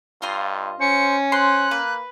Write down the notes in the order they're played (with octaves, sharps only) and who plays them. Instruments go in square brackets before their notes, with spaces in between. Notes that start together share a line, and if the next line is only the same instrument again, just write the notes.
[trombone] G2 [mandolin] F4 D#5 C6
[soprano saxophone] C#4 [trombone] C5 [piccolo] C#7
[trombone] C5 [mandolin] C6 [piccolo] F#6
[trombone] A#3 [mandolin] B4